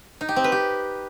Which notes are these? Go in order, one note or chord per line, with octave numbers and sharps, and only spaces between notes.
D#4
G4
C4
B4
G4